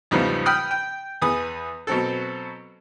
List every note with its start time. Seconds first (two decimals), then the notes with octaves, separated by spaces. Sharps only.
0.11 E2 G#2 C#3 F3 G3 B3
0.46 F#5 G5 B5 D#6 F6
0.71 G5
1.22 E2 G#4 B4 D#6
1.87 B2 F#3 C4 A4